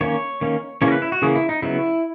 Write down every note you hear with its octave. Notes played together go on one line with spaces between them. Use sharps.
D#3 A#3 C#4 C#5
D#3 A#3 C#4
C#3 E3 A#3 C#4 C#5
A#4
B4
E4
F#4
C#3 E3 A#3 C#4 G#4
E4
D#4
C#3 F#3 B3 E4